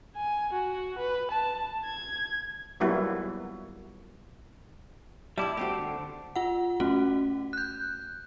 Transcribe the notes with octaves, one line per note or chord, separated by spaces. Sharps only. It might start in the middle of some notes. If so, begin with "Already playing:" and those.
G#5
F#4
B4
A5
G#6
F#3 G3 A#3 B3 E4 F#4
G2 G3 E4 E5 A5 D6
A3 C4 F#4 G4
D3
F4 F#5
A3 C#4 F#4
F#6 G6